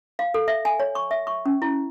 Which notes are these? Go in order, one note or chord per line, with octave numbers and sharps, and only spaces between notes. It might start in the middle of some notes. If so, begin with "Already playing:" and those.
F5
A4
E5
G#5
C#5
C#6
E5
C#6
C#4
E4